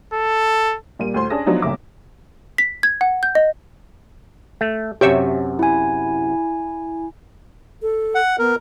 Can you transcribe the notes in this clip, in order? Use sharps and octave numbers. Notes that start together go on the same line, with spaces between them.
A4
A#2 G3 A#3 D#7
D2 A2 C5 C6
C#4 D4 G#4 A5 D#6 A#6
F3 F#3 B3 D4 D#4
G1 C2 A#2 C#3 E5 D6
B6
G#6
F#5
G6
D#5
A3
F#2 C3 G4 C#5 E5
E4 G#5
A4
F#5
B3 A#4